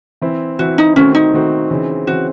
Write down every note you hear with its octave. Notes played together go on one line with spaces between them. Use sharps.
E3 C4 E4
E3 C4 E4 F#4
D#4
D#3 A3 C4 C#4 F#4
D#4
D#3 A3 C4 F#4
C#3 E3 C4
C#3 E3 C4 F#4